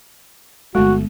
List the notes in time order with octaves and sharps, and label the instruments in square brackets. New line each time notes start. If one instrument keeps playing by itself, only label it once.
[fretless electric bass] G1 A3 [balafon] G#3 B3 [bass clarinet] F#4